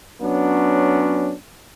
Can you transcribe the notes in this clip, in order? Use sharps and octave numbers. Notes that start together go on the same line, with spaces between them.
F#3 B3 C#4 D4